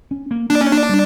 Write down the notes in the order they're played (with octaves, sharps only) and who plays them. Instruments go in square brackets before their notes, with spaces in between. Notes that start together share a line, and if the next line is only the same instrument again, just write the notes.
[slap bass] C#4
A#3
[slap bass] A#3 [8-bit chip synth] D4
[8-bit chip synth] C#4
D4
[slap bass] G3